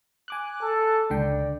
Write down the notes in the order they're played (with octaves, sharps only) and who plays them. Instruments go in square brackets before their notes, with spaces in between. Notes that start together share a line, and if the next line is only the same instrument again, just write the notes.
[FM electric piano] G#5 D6 F#6
[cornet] A4
[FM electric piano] C#2 D3 G5 [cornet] D5